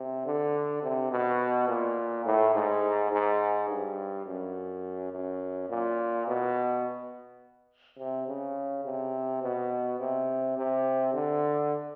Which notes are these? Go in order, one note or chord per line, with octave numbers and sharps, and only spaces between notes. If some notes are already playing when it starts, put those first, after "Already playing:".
Already playing: C3
D3
C3
B2
A#2
A2
G#2
G#2
G2
F#2
F#2
A#2
B2
C3
C#3
C3
B2
C3
C3
D3